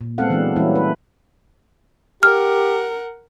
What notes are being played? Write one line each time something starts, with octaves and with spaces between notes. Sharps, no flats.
A#2
G#3 B3 C4 A4 F5 F#5
E3 F#3 G#3 B3 D4
E3 F#3 G3 A#3 C#4 E4
B4
G4 A#4 F#5 F6